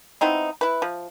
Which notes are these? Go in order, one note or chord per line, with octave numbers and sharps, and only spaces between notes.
B3 C4 D#4 E4
E4 B4
F3